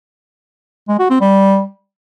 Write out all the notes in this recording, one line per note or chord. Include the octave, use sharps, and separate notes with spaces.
G#3
F#4
C4
G3